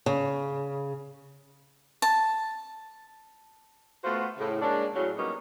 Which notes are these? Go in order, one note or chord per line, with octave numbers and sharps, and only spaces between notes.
C#3
A5
A3 B3 F4 F#4 C5
A2 C#3
G#3 A#3 C#4 D4
A2 C#3 F#3
F#3 G3 A#3 B3 C#4 D#4